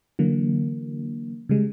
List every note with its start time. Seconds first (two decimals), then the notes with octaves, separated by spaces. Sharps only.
0.19 D3 E3 F#3 A#3
1.49 C#3 G3 G#3